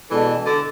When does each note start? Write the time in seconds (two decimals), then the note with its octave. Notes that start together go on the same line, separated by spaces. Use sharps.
0.11 B2 E3 G#3 D4 A4
0.46 D3